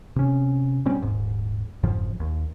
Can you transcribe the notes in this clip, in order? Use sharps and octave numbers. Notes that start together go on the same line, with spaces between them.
C3 C#4
B2 G3 C4 C#4
D#1 G#2
F#1 F2 G#2 F3
D#2